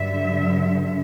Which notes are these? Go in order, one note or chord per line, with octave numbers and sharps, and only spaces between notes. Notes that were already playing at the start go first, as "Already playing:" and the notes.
Already playing: G2 D3 F#3 E5